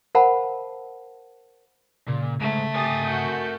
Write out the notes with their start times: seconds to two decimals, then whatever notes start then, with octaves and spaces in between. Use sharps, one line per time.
0.15 A#4 C5 F5 F#5 A5 B5
2.08 A#2 C#3
2.41 G#2 A3
2.75 G4 A#4 G#5 D#6 A6
3.06 F#4 G6